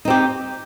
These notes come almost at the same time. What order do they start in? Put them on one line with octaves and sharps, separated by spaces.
D#4 C4 G4